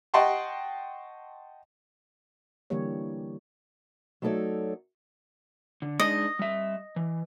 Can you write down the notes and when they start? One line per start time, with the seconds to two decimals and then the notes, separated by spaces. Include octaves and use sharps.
0.14 D#5 F#5 G5 A5 C6 C#6
2.70 D3 E3 G3 A#3 G4 C#5
4.22 F#3 A3 D#4 A4 C#5 D5
5.82 D3
6.00 G#3 D4 D#4 D#5
6.39 G3 E5
6.96 E3